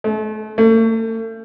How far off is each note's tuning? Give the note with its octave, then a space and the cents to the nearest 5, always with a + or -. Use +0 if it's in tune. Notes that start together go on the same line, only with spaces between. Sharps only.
A3 -35
A3 +40